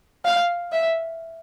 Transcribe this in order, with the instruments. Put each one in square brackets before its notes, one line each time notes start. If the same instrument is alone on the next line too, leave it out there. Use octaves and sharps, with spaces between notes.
[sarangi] F5
E5